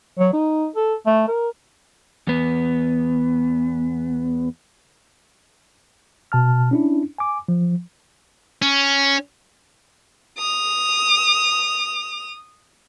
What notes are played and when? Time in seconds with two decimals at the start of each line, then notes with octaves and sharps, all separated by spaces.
0.19 F#3
0.33 D#4
0.76 A4
1.06 A3
1.28 A#4
2.27 E2 B3
6.32 B2 A5 F6
6.71 C#4 D4 E4
7.18 G#5 D6
7.48 F3
8.62 C#4
10.38 D#6 F7